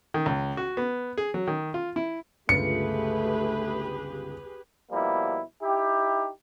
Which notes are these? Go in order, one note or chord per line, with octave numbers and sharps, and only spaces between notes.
D#3
C#2
F#4
B3
G#4
F#3
D#3
F4
E4
G1 C#2 A3 F4 G4 G#4 B4 C#7
B2 F3 G3 A#3 E4
D#4 E4 G4